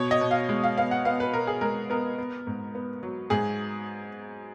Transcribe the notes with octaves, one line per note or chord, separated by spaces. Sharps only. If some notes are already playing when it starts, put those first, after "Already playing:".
Already playing: B2 C#5
D#5
B2
F5
G#3
F5
B3 F5
F#5
B3 F5
B4
B2 A#4
G#4
G#3 A#4
B3 A#4
B3
G#2
B3
F#3
G#2 G#4